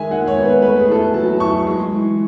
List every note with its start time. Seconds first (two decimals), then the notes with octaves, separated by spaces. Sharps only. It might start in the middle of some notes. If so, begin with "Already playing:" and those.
Already playing: D#3 G#3 E5 G#5
0.11 G#3 F#5
0.28 C#5
0.36 B3
0.45 B4
0.62 A3 B4
0.80 G#4
0.88 E4 A4
0.97 B4
1.14 F#3 A5
1.40 E4 C#6
1.67 G#3
1.92 E3